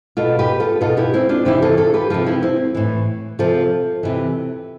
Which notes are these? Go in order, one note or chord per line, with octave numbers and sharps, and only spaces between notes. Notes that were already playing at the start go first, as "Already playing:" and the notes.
B2 F4 A4
G4 B4
F4 A4
B2 F4 A4
E4 G4
C4 E4
D4 F4
C3 E3 E4 G4
F4 A4
F4 A4
G4 B4
C3 F3 F4 A4
E4 G4
C4 E4
A2 E3
C3 F3 F4 A4
C3 E3